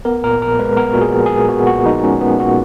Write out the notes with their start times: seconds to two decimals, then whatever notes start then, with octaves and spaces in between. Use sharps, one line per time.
0.05 B3 A#4
0.23 A#2 A#4
0.41 A#1 A#4
0.59 G#3 B4
0.77 B3 A#4
0.93 A#2 F#4
1.01 G#4
1.13 A#1
1.26 G#4
1.32 G#3
1.49 B3 F#4
1.67 A#2 F#4
1.86 A#1 D#4
2.03 G#3 C#4
2.21 B3
2.40 A#2 F#4